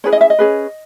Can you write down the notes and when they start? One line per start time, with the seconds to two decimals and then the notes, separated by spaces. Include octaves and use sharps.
0.04 C#4 E4 G#4 B4 C#5
0.12 D#5
0.21 E5
0.30 D#5
0.39 C#4 G#4 B4